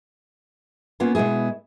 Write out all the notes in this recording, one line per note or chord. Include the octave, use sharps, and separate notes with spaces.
A#3 B3 C#4 F4
B2 G#3 B3 E4 G#4